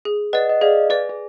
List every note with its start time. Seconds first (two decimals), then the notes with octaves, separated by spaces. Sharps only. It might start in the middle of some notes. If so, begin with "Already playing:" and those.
0.05 G#4
0.33 B4 D5 D#5 F#5
0.49 D#5
0.61 G#4 D5 F5
0.90 G#4 B4 D5
1.09 G#4